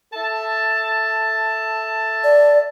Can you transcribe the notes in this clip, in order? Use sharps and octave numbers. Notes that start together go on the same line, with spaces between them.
A4 E5 A5
D5